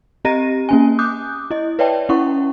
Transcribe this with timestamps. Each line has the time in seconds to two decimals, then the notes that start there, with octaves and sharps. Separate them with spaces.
0.25 C4 G4 D#5 A#5 A#6 D#7
0.69 A#3 C#4 G#5
0.99 D6 D#6 F#6 G6
1.51 E4 D#5
1.79 B4 C#5 D5 E5 G5 A5
2.09 C#4 E4 F#5 C#6